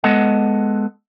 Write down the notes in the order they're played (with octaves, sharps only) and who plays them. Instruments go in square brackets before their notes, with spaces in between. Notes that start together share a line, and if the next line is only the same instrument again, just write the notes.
[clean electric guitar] G#3 B3 A4 D#5 F#5